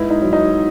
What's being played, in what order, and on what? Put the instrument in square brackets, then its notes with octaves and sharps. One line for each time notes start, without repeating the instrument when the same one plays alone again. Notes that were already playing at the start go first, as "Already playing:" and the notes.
Already playing: [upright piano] G#2 B4 [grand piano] D#4 E4
[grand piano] D#4
[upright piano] F#3
[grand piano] D#4